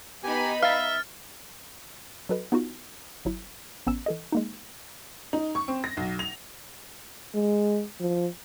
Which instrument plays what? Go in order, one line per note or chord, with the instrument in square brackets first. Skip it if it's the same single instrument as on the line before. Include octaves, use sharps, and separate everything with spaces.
[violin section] B3 D#4 B5 [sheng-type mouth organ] G4 G#5
[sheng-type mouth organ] E5 [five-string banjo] F5 [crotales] F6 A6
[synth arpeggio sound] F#3 F#4 A4 B4 D#5
B3 D#4 F4 F#4
G1 F#3 E4
A1 B3 C#4 A#5 E6 E7
E3 A4 D#5
G#3 A#3 D#4
[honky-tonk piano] D#4
C#6
C4
A#6
B1
F7
[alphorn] G#3
F3